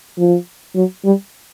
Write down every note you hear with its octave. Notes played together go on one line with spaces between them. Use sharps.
F3
F#3
G3